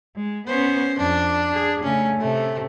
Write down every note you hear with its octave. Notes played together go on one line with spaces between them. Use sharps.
G#3
B3 C#4 C5
F2 D4
G#4
C#3 A3 C#4
C3 A3